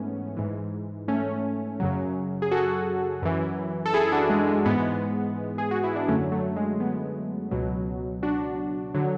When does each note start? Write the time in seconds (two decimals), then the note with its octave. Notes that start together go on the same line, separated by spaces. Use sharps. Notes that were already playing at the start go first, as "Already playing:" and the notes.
Already playing: G#2 E3 A3 B3 C#4
0.37 G#2 E3
1.08 A3 C#4
1.80 F#2 C#3 F#3
2.42 G#4
2.51 F#4 A4
3.22 F#2 E3
3.85 A4
3.94 E4 G#4
4.07 E4
4.12 D4 F#4
4.30 G#3
4.48 G#3
4.65 G#2 E3 G#3 B3
5.58 G#4
5.71 F#4
5.84 E4
5.96 D4
6.08 F#2 D3 F#3 A3 C#4
6.32 F#3 A3
6.56 G#3
6.80 G#3 B3
7.51 C#2 B2 F#3
8.23 D4 F#4
8.94 D3 F#3